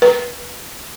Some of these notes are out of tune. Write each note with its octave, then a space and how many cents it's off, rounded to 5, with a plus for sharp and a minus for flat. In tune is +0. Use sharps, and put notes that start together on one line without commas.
B4 -20